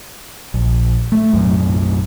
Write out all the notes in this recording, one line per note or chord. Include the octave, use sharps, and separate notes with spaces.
A#1
A3
B1 F#2 A2